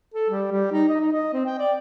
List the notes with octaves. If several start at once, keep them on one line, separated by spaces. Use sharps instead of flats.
A4
G3
G3
D#4
D#5
D#4
D#5
C4
G5
D5